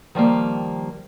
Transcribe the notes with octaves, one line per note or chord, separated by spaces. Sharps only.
D#3 F3 G3 A#3